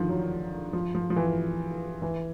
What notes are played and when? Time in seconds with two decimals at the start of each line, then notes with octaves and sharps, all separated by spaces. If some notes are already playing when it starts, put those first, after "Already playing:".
Already playing: D3 D#3 F3
0.09 F#3
0.73 F3
0.95 F3
1.10 F3
1.16 E3
2.02 E3